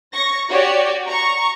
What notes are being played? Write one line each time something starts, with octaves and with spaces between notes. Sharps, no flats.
C#5 C#6 A#6
F#4 G4 C#5 D5
A#5 C#6